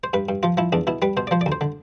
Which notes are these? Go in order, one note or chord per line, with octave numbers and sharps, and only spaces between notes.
C5
G2 B4
G2
F3 F4
F3 E4
E2 D4
B2 E4
G3 B4
B2 C5
D5
F3 C5
D5
D2
C5
D3